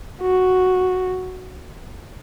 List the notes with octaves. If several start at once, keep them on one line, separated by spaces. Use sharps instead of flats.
F#4